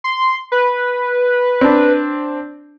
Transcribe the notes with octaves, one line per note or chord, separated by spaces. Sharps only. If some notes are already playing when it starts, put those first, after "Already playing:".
C6
B4
C4 D4